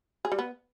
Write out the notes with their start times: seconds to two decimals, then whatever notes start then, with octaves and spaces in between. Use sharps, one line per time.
0.25 G#4
0.32 G3
0.39 B3